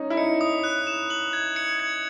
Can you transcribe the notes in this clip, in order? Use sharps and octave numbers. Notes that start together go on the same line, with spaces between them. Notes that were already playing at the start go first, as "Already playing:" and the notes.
Already playing: C#4 D#4
E4
D#4 C#7
D#6
F#6
E7
F#7
G#6
C#7
G#6